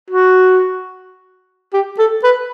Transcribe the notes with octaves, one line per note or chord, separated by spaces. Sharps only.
F#4
G4
A4
B4